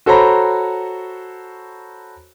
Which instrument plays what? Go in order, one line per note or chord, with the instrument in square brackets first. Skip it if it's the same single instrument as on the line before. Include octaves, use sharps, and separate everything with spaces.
[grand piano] F#4 A4 C5 C#5 A#5 B5